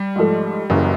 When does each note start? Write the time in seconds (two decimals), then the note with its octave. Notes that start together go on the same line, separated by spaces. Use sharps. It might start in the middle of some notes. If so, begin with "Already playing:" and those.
Already playing: G3
0.16 G#2 F3 A3
0.70 F#1 F#2 C#3 E3 F#3